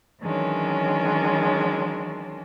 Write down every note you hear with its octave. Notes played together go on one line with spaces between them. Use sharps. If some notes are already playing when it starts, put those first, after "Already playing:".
D#3 E3 F#3 G#3 C#4 D4